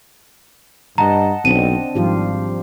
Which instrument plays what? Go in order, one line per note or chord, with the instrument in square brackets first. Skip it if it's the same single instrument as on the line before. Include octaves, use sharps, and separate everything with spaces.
[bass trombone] G2 [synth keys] D#5 F#5 A5 [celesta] A#5
[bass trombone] B1 [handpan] C4 D4 [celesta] D#7
[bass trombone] G#1 [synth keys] G#2 F3 [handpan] G3 F4 G4